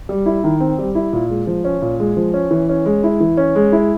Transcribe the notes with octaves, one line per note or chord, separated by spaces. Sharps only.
G3
E4
D#3
C4
G3
E4
A#2
G#3
F3
C#4
A#2
G#3
F3
C#4
E3
C#4
G#3
E4
E3
C#4
G#3
E4